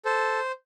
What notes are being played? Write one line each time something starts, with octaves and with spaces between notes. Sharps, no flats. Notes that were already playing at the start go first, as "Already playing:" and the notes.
A4 C5